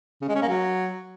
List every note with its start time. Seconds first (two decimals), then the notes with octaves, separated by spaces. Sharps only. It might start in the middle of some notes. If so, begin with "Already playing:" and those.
0.22 C#3
0.28 G#3
0.35 C#4
0.42 A#3
0.49 F#3